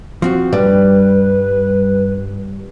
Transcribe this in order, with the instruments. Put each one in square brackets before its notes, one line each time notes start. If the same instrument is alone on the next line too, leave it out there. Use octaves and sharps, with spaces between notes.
[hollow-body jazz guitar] F3 C4 F#4
[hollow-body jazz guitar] G2 [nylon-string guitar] G3 [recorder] B4